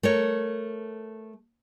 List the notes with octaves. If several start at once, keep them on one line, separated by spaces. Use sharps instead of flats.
A3 A#4 C#5